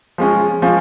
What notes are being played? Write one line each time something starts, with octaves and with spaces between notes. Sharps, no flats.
F3 G#3 C#4 F4
F3 G#3 C#4 F4